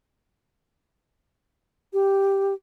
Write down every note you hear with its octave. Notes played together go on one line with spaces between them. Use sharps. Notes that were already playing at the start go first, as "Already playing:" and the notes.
G4